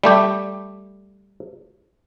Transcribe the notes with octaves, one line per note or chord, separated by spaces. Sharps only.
G3 A3 G4